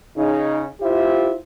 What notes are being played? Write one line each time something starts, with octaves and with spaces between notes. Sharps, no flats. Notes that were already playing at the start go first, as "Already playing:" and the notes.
C#3 D#4
E4 F4 G4 C5 E5